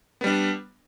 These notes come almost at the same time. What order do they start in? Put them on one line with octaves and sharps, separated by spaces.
B3 G3 D4